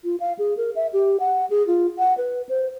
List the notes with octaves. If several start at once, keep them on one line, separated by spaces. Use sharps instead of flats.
F4
F5
G#4
A#4
E5
G4
F#5
G#4
F4
F#5
B4
C5